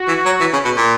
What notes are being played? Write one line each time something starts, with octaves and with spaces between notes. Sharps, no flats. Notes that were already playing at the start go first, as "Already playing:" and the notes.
Already playing: F#4
E3
F#3
E3
C#3
B2
A#2